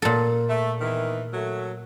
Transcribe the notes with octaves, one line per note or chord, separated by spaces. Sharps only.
A#2 A4
A3
E2 D#3 E3
F#3 A3